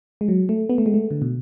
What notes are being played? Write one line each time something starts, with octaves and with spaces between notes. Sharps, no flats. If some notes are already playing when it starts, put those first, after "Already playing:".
G#3
F#3
A3
B3
A3
G#3
A3
D3
B2